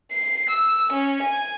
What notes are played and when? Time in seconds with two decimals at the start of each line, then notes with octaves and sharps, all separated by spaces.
0.12 C7
0.50 E6
0.93 C#4
1.23 G#5